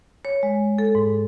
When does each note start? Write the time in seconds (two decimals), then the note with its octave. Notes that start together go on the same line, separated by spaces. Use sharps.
0.25 C#5
0.43 G#3
0.78 A4
0.95 G#2